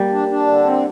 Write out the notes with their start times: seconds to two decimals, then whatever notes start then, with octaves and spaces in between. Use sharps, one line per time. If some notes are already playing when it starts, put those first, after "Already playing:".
Already playing: G3 A#3
0.11 D4
0.28 D4
0.46 D3
0.64 C4